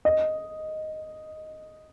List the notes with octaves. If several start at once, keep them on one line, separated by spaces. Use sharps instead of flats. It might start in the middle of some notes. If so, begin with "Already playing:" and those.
D#5